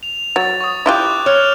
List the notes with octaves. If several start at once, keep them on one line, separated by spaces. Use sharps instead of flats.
F7
F#3 A6
C#6 D#6
E4 F4 G4 D6 F#6 G6
C#5 F6 F#6 F7